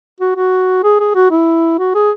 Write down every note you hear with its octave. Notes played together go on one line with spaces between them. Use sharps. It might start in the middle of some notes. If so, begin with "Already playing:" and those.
F#4
F#4
G#4
G#4
F#4
E4
F#4
G#4